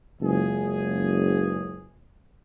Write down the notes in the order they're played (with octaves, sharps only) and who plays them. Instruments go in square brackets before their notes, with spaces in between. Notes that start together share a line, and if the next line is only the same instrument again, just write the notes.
[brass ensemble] F#1 C#2 G#4